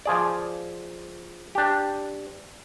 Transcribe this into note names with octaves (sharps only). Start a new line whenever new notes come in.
F3 G#4 D5
D4 G4